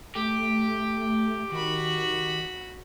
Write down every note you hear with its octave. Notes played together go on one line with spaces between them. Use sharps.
A3 G4
D#3 F#4 B5